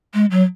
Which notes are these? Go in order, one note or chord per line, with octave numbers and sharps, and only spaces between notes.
G#3
F#3